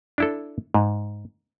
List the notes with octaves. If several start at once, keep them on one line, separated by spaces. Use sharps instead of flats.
D4 E4 A4
G#2